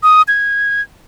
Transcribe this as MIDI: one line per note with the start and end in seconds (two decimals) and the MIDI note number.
0.03 0.22 87
0.28 0.81 92